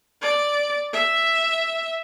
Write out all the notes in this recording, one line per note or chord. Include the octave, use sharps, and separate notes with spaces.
D5
E5